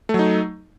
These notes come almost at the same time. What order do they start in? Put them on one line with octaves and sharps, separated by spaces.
A3 F#3 D#4